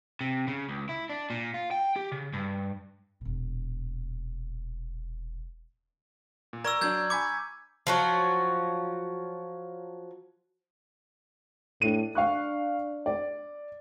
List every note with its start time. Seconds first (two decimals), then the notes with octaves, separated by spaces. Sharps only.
0.21 C3
0.48 C#3
0.68 C#2
0.89 E4
1.09 D4
1.30 A#2
1.54 F4
1.71 G5
1.96 G4
2.12 C#3
2.33 G2
3.21 E1 A#2
6.53 A#2
6.64 A#4 D5 A#5 C#6 E6 G#6
6.81 F#3 D4 D5 G6 G#6
7.10 G#5 B5 C#6 D6 G#6
7.87 F3 F#3 F#4
11.82 A2 D4 D#7
12.15 D4 F5 C#6 F#6
13.06 D5